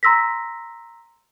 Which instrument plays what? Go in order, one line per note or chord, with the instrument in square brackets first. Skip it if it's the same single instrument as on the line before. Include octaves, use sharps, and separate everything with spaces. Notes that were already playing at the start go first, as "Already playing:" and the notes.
[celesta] A#5 C6 E6 A#6 B6